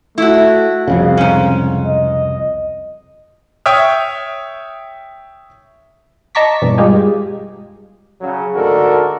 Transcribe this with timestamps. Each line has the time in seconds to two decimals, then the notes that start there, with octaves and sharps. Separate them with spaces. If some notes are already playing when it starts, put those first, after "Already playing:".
0.18 A3 E4 F#4
0.88 C2 F2 C#3 F5
1.17 G#2 C#4
1.86 D#5
3.66 C#5 E5 G5 D#6 F6
6.35 D#5 A5 A#5 C#6 D6 B6
6.62 G2 B2 E3 G3
6.78 G3 G#3 D#4 F4 G4 G#4
8.21 C#3 F#3
8.55 D2 G#2 D3 F#4 A4 A#4